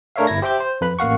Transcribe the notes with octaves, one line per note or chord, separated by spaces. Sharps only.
A3 D4 A#4 C#5 E5 F5
G1 E4 G#6 A#6
G4 C5 E5 G5 D6 G6
C5
F2 B4 B5
A1 A#3 F5 F#5 C#6